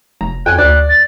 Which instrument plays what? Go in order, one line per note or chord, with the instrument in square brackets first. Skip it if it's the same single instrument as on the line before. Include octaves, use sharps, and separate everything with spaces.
[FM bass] F1 [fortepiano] A#5
[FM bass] F2 [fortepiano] G5 G#5 [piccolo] F#6
[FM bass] D2 [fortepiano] D5 [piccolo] F#6
[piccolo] A6